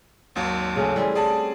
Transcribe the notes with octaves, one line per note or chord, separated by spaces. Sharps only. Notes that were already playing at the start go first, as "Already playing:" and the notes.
G#1 D#2 F#3
C#3 A3 C#4
E3 G3 C4 C#4
G#4 D5 A5